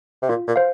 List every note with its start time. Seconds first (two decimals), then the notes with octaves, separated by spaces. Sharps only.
0.22 C3
0.29 A#2 F4
0.47 A#2
0.56 C5 F5